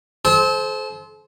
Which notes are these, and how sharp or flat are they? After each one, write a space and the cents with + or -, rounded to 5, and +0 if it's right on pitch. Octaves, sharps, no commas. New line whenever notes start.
A4 -40 C5 +0